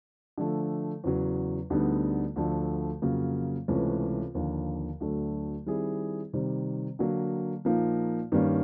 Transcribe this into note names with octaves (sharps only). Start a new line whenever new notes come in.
D3 F3 A3
E2 C#3 F#3
D2 D3 G3 B3 D#4
D2 D3 F3 A3
F2 C#3 F#3 A#3
C#2 C3 E3 A3 C#4
D#2 D3 F3
D2 D3 F#3 A3
D#3 G3 C4 E4 G#4
C3 D#3 G3
D3 F#3 A#3
A#2 F3 A#3 D#4
G2 D#3 G3 A#3 C#4